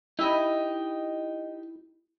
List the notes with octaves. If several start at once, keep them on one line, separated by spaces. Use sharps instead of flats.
D#4 E4 G4 D#5